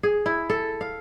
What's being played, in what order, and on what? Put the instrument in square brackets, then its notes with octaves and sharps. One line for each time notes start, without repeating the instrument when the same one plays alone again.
[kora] G#4
E4
A4
F5